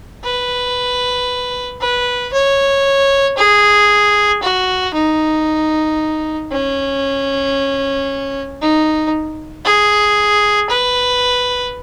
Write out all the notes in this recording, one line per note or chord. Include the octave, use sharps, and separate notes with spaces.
B4
B4
C#5
G#4
F#4
D#4
C#4
D#4
G#4
B4